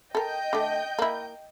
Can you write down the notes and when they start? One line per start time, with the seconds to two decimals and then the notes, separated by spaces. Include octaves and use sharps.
0.15 A4 A#4 D#5 G5 G6
0.53 D3 A3
0.99 A#3 E4